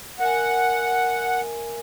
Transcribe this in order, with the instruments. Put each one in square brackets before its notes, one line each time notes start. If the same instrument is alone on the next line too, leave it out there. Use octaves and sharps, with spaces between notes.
[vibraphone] A#4 E5 G#5 [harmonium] F#5